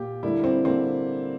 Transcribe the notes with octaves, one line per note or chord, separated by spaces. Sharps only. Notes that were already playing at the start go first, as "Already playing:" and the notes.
Already playing: A#2 G4
D3 G3 A#3 E4
C4
D3 G3 A#3 C4